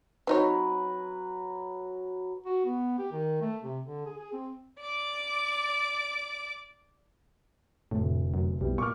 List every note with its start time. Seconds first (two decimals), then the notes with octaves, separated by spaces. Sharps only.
0.27 F#3 C4 D#4 B4 C#5
2.46 F#4
2.65 B3
2.98 G4
3.12 D#3
3.41 A3
3.62 C3
3.86 D3
4.06 G#4
4.19 G#4
4.32 C4
4.81 D5 D6
7.91 F1 D2 A2
8.34 F#2
8.61 B1 G3 B3 E4
8.78 A#2 C#6 D6 F6